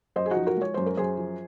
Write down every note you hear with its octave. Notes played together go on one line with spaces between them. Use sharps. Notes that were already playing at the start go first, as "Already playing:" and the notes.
F#2 C5 D#5
G#4
F3 D#4 F#4
F#4 A#4
G#3 C#5
F#2 C5
A#4
F#2 G#4 C5
F3